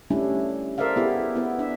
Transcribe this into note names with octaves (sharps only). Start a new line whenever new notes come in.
G3 A3 C#4 D4 E4
A4 A#4 C5 D5 E5 F5
B3 E4 G4 G#4
B3 E4
D4 E5